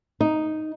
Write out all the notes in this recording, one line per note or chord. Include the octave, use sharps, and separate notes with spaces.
D#4